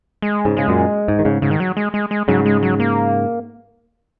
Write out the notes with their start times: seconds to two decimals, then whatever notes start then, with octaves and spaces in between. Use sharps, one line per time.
0.22 G#3
0.45 G#2 C#3
0.57 C#3 G#3
0.68 F#2 A#2
1.08 G#2
1.19 D#3
1.25 G#2 C#3
1.42 G#2 C#3
1.51 D#3
1.60 F#3
1.77 G#3
1.94 G#3
2.11 G#3
2.28 G#2 C#3 F#3
2.46 G#3
2.63 F#3
2.80 A#3